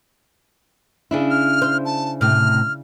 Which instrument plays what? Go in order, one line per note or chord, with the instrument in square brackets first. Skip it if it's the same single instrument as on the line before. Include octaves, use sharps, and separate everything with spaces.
[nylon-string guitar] C#3 D4 E4
[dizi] F6
[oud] C5
[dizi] A5
[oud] A2 C3 [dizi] F6